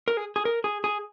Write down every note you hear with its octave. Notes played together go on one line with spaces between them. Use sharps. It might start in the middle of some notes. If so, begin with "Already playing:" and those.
A#4
G#4
G#4
A#4
G#4
G#4